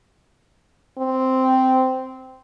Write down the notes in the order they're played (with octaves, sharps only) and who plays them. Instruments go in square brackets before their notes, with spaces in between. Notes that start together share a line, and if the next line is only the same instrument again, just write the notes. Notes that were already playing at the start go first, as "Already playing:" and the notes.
[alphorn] C4